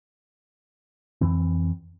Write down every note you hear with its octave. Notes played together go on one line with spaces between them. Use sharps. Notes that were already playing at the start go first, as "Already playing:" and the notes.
F2 E3 C4